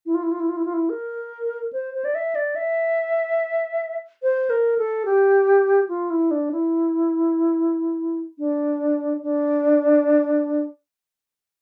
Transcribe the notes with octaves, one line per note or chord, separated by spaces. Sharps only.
E4
F4
E4
F4
E4
F4
E4
F4
E4
A#4
C5
C5
D5
E5
D5
E5
C5
A#4
A4
G4
F4
E4
D4
E4
D4
D4